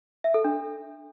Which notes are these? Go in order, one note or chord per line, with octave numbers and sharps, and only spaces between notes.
E5
A4
D4